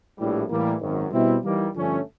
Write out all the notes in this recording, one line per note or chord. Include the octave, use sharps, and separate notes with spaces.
A#1 A2 E3 G3
A2 E3 G3 A#3
G#1 F#2 D#3
B2 G3 C4 E4
E3 G3 A#3 D#4
G2 D3 F3 A3 C#4